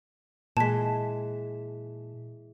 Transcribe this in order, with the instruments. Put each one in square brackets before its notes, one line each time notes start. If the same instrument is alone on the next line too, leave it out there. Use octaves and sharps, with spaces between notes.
[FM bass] A#2 [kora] E3 G#3 [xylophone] A5 B6